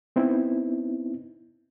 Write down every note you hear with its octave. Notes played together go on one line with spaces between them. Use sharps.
B3 C4 D#4 E4